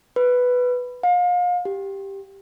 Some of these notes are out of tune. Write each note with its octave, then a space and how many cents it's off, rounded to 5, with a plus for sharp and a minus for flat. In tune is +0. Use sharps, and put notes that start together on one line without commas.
B4 +5
F5 +35
G4 +0